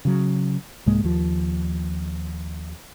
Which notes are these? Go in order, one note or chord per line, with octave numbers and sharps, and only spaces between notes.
C#3 F#3
C2 G#2 G#3 A#3
D#2 F3